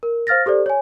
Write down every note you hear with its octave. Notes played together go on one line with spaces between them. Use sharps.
A#4
C5 F5 F6 A6 A#6
G4 A4 C5 D5
C#5 G#5